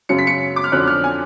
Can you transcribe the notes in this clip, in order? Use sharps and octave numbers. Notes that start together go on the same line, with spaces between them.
F#2 C#3 F#3 C#4 C#7
B6
C#7
D6
F6
F2 D3 F#3 C#4 F#6
F#6
F6
G#5